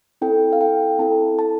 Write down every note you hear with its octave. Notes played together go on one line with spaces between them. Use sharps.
C4 E4 A4 G5
F5
G5
C4 E4 A4 A5
A5